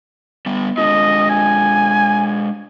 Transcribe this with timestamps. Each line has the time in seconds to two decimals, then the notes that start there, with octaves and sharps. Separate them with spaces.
0.46 G3 B3
0.78 G#3 D4 F4 D#5
1.30 G#5